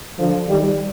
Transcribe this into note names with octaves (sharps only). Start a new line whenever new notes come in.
D3 F3
D#3 G3